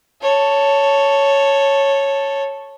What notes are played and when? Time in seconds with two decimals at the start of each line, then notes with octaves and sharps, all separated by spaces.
0.22 A4 C#5